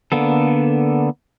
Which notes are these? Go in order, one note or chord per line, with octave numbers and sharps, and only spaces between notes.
D3 A#3 B3 A4